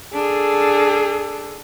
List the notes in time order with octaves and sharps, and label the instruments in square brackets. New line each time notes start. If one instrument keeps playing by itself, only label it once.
[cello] D4 [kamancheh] G#4 A4